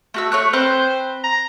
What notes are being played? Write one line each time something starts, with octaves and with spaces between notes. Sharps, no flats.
A3 F#4 E6
A3 C#5 F#6
C4 B4 C5 F#6
A#5